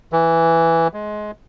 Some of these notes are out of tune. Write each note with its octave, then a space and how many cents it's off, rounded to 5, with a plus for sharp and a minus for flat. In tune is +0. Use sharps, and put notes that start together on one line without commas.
E3 +5
G#3 +20